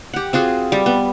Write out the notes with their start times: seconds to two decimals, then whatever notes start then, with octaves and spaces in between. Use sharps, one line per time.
0.14 G4 F#5
0.33 C4 F4 F#4 G#4
0.72 G3
0.86 B3